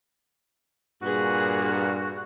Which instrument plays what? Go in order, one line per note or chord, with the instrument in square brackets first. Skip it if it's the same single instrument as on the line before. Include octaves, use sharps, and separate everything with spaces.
[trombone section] G2 A#2 [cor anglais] F#4 [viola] G#4 B4